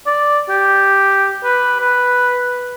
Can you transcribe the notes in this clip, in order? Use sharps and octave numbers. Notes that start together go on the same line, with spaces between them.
D5
G4
B4
B4